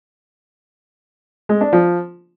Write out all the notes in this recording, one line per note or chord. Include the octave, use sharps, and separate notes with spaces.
G#3
D4
F3